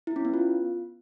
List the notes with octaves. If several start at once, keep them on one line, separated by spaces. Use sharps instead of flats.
E4
C#4
B3
F4